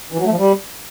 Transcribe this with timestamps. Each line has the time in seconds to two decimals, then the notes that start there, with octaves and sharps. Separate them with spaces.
0.12 E3
0.19 F#3
0.25 A3
0.32 F3
0.38 G3